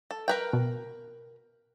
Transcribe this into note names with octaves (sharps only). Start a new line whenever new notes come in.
A4
A#4 B4 G5
B2